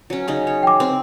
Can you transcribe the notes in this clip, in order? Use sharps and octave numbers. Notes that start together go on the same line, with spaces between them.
F#3 C#4
C#3 C#4 D#4
C#5
G5 D6
C4